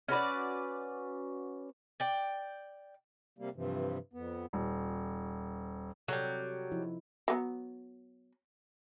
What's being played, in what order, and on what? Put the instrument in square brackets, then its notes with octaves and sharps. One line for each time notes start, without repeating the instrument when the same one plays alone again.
[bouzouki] C#4 F#4 B4 D5
D5 G5
[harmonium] C3 G3 A#3
G2 C3 E3 F3
F2 B3
[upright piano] D#1
[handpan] C3 A4 [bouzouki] F#3 G3
[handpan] F3 D#4 E4
[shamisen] F#3 B3